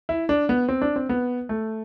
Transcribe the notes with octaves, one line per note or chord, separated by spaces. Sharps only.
E4
D4
B3
C4
D4
C4
B3
A3